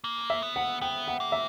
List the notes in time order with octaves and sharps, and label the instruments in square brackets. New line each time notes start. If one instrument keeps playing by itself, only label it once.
[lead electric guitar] A#3
[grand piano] E5
[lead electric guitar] B3
[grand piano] F#5
[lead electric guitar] B3 [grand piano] G5
[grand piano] F#5
[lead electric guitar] A#3
[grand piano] E5